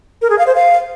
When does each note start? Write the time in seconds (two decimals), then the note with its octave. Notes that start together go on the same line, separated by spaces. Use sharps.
0.22 A#4
0.30 G#4
0.38 F5
0.47 C5
0.55 F5